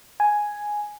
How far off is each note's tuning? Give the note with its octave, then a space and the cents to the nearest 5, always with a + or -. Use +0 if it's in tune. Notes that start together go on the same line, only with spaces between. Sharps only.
G#5 +0